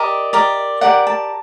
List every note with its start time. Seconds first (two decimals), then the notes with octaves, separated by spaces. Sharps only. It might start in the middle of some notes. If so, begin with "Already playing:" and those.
Already playing: G4 A#4 D5 D#5
0.33 G4 A#4 D5
0.81 G4 A#4 D5 F#5
1.07 A5